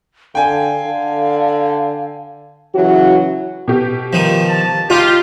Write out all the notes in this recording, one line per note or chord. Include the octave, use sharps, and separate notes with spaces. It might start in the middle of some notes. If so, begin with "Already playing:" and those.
D3 F5 G5 G#5
D3
C#3 E3 F#3 F#4
B2 G4
D#3 F3
A5
D#4 F4 G4